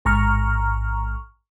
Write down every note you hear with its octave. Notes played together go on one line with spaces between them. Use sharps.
A1 G#2 A#5 C#6 F6